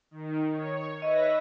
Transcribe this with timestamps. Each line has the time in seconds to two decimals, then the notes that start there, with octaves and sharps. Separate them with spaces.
0.11 D#3
0.52 C#5
1.02 B4 D#5 E5 A#6